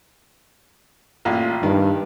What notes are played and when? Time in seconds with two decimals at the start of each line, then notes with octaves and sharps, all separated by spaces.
1.25 A1 A#2 F5
1.63 G2 D#3